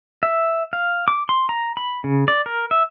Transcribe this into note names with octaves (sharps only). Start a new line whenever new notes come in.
E5
F5
D6
C6
A#5
B5
C#3
D5
A#4
E5